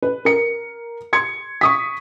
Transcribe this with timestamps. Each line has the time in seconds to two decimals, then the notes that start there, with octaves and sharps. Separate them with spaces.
0.02 B4
0.25 A#4 C#7
1.13 C6 G#6 C#7
1.61 C#6 D#6 B6